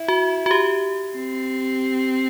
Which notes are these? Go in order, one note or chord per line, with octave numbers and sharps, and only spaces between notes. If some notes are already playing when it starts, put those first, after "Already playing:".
Already playing: E4
F#4
F#4
G4
C4